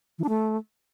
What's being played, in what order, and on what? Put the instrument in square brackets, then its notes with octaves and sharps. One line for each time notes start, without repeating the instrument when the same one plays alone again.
[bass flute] E3
D4
A3